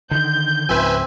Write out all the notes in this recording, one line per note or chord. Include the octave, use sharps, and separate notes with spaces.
D3 D#3 G6
C#2 G#2 F3 C4 B4 E5 G#5